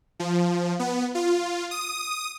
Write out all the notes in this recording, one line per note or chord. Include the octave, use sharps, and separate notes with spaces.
F3
B3
F4
D#6